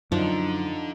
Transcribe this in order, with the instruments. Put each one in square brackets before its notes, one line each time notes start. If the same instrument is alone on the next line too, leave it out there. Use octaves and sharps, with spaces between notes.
[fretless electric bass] F#2 [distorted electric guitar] D3 D4 [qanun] F3 [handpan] D#4